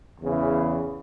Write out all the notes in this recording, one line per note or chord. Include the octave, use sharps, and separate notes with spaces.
E2 C#3 E3